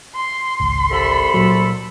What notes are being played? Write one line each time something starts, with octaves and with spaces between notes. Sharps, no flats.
C6
G#1 C#2
C2 A4 B5
A#2 F#3